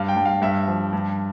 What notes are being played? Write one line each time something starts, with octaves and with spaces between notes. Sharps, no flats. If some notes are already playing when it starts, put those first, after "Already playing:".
Already playing: G2 F5
G5
G2
F5
G2 E5
F3
G2